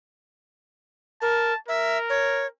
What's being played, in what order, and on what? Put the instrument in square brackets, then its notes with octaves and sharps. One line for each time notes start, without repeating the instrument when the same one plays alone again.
[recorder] A#4 [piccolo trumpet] A5
[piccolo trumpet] A#4 [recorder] E5
[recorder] C#5